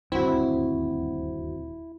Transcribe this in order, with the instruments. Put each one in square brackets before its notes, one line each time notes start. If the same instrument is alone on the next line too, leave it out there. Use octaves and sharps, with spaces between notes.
[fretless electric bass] D#1 D2 G2 [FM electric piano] C4 F#4 [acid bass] E4